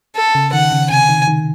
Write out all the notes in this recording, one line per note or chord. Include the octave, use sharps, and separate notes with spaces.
A4
C#3
D#3 F#5
C#3
C3 G#5
D#3
D#3